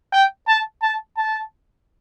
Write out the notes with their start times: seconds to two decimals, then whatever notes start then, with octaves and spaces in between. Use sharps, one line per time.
0.13 G5
0.48 A5
0.83 A5
1.17 A5